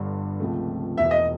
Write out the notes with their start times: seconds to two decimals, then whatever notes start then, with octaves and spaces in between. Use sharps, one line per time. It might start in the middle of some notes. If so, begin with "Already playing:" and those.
Already playing: G1 G2 D3
0.40 C#2 C3 F3 A3
0.97 E1 E2 B2 E5
1.11 D#5